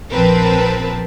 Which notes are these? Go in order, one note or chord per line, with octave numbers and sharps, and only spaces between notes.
A#1 F3 C4 A#4 B4 A5